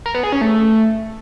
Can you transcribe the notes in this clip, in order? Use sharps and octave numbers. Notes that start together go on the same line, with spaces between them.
A#4
B3
G#4
C#4
A3